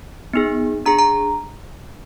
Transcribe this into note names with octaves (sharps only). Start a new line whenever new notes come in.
B3 D#4 G#4
D4 G#4 A#5
A#5